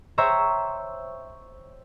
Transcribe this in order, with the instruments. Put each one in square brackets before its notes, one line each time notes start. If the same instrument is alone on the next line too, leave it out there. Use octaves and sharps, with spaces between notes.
[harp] C5 C#5 E5 G5 A#5